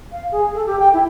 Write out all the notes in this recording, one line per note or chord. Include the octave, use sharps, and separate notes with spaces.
F5
G#4
A4
G4
G5
E4